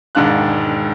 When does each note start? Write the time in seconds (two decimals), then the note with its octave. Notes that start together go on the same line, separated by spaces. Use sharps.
0.15 E1 G#2 D#3 D4 F5 F#6